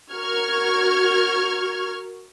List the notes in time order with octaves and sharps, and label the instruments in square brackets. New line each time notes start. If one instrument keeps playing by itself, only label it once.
[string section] F#4 A#4 C#6 F6 G#6